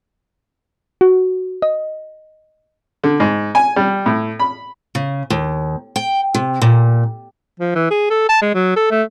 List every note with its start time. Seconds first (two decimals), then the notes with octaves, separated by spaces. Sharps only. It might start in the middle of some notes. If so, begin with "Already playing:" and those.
1.01 F#4
1.62 D#5
3.04 D3
3.20 G#2
3.55 G#5
3.76 G3
4.06 A2
4.39 B5
4.95 C#3
5.30 D#2
5.96 G5
6.34 C3
6.62 A#2
7.60 F3
7.75 E3
7.90 G#4
8.10 A4
8.29 A5
8.41 G#3
8.54 F#3
8.76 A4
8.91 A3